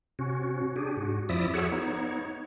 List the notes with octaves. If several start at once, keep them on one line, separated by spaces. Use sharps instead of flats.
C3 C#4 F#4
D4 G4 G#4
G#2 F#4
F2 F3 E4 D5 E5 D#6
F#4 G#4 A4 C#5 E5 F#5
B3 D#4 C#5